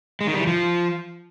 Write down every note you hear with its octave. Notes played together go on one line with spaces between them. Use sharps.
G#3
D#3
G3
E3
F3